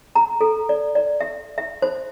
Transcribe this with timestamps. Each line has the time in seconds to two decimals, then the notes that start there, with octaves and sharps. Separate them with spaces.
0.15 A#5
0.41 A4
0.69 D5
0.95 D5
1.21 E5
1.58 E5
1.82 C5